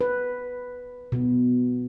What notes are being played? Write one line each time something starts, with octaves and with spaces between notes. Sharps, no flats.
B4
B2